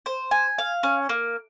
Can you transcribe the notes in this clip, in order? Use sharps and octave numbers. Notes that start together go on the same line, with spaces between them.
C5
G#5
F5
C#4
A#3